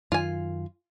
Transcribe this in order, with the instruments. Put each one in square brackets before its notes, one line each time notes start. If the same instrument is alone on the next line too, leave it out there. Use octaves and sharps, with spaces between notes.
[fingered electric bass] F#2 D#3 [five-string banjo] F4 G#5